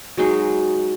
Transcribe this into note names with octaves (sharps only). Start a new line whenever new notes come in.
F#3 G#3 D#4 G#4